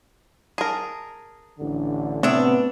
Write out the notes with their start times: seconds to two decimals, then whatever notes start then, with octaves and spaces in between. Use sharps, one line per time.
0.58 G#4 A#4 A5
1.58 A1 D3
2.23 A2 C3 B3 D4 C#5 E5 D#6